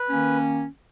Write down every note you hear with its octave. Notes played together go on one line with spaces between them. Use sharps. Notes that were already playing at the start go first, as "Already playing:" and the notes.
Already playing: B4
D#3 A#3 C#4